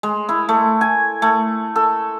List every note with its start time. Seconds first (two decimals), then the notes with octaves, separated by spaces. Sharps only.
0.03 G#3
0.29 E4
0.49 A3
0.81 G#5
1.22 A3
1.76 A4